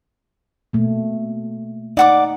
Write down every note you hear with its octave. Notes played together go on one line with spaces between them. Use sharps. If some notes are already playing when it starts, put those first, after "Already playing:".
B2 A3 A#3
D#4 D5 F#5 D6